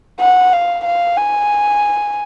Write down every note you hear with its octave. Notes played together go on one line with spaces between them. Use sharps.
F#5
F5
F5
G#5